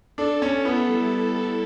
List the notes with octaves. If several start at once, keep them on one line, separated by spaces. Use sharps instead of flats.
D4 A4
C#4 A4
B3 E4
G3
E4
A4